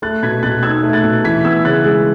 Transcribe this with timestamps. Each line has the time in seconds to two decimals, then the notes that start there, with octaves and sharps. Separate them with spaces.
0.02 A3 F#6 A6
0.23 B2 G#6 B6
0.43 B2 F#6 A6
0.63 D#4 E6 G#6
0.83 A3
0.93 F#6 A6
1.04 B2
1.24 E3 G#6 B6
1.44 B3 E6 G#6
1.65 C#3 F#6 A6
1.85 G#3